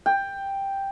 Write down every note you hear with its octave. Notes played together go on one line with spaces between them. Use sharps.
G5